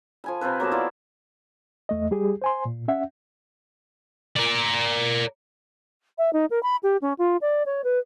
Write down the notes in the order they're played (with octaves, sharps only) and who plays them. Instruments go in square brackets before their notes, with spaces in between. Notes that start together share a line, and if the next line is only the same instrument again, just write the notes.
[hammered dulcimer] F3 G#5 B5
C3 C4 F4 B4
F#3 A#3 B3 A5
E4 F4 D5
[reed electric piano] E2 A3 D#5
G3 G4 G#4
C5 G#5 C6
A#2
C#4 E5 F#5
[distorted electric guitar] A#4 D5
[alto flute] E5
D#4
A#4
B5
G4
C#4
F4
D5
C#5
B4